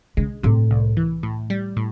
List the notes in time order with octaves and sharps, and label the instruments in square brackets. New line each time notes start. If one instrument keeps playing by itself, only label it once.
[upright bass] C#3 [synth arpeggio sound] G#3
[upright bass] A2 [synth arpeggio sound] C3
[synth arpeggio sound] C2
E3
A2
G3
A2